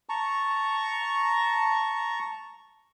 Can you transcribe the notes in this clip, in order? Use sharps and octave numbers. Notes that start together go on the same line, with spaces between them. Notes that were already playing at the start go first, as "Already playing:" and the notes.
A5 A#5 C#6